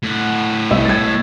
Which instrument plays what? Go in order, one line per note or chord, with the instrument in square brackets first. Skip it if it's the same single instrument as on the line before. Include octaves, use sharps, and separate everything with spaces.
[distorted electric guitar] A2 F#5
[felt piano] C2 D#5 E6
G#6 A6